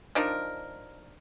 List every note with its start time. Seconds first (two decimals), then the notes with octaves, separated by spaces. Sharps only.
0.15 F3 D4 D#4 A#4